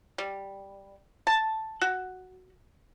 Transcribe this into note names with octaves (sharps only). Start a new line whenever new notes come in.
G3
A5
F#4